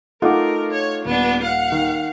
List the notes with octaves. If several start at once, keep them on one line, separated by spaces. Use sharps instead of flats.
A3 D#4 F4 A#4 F#5 D6
C#5
D#1 B3 D4
F5 F#5
D#3